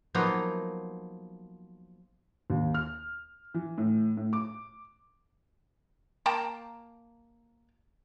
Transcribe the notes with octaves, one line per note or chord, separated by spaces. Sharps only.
F3 F#3 A#3 B3 D#4 F4
D#2
F6
E3
A2
A2
D6
A#3 G5 A5 A#5